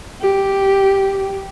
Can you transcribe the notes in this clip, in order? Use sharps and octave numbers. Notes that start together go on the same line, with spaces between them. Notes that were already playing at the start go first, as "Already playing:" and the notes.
G4